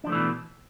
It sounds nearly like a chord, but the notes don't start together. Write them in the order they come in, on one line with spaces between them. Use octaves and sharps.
D4 F3 A3 E3 B2